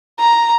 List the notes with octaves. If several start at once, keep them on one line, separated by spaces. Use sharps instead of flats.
A#5